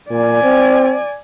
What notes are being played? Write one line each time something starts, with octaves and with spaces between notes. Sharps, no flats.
A#2 D5 G#5
C4